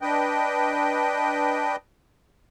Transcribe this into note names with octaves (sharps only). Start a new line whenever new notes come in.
D4 B4 D#5 G5